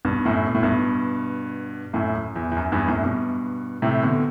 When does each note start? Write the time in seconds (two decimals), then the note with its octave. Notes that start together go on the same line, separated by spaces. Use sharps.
0.05 G2 B2
0.25 F#2 A2
0.47 B2
0.55 A2
0.63 G2 B2
1.93 F#2 A2
2.15 F#2
2.36 E2
2.52 E2
2.57 F#2
2.72 E2 G2
2.88 F#2 A2
3.03 G2 B2
3.82 A2 C3
4.03 B2 D3